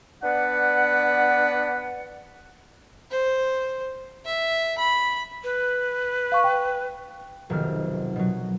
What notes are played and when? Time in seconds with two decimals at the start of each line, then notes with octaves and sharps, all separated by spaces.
0.23 B3 D4 B4 D5 F#5
3.11 C5
4.25 E5
4.78 B5
5.44 B4
6.32 F5 C#6
6.44 G5
7.50 F1 B1 C3 D#3 F6
8.16 B2 F#3